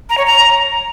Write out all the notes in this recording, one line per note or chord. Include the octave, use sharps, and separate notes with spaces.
A#5
C#5
A#5